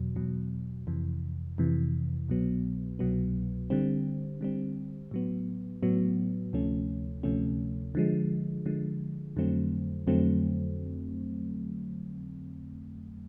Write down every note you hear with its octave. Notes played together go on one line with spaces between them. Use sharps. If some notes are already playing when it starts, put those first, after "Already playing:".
Already playing: E2 B2 F#3
E2 B2 F#3
F2 C3 E3
F2 C3 E3
C2 B2 F#3 B3
C2 B2 F#3 B3
D3 G3 C4
D3 G3 C4
A2 F#3 B3
A2 F#3 B3
D2 C3 F3 A3 C#4
D2 C3 F3 A3 C#4
D3 F3 G#3
D3 F3 G#3
F2 D3 F#3 A3 C4
F2 D3 F#3 A3 C4